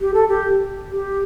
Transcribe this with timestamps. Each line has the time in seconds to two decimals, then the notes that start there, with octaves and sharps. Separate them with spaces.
0.01 G4
0.14 A4
0.28 G4
0.91 G4